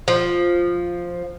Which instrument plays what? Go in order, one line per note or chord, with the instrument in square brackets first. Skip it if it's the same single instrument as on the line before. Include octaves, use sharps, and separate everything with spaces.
[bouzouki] F3